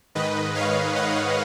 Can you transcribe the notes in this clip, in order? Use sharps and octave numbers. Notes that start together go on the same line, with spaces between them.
G#2 D#3 B4 D#5
C#5 F5
D#5 F#5